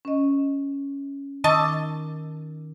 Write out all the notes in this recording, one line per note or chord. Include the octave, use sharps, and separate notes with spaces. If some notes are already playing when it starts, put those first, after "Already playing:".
C#4 D#5
D#3 D#5 A5 C#6 D6 E6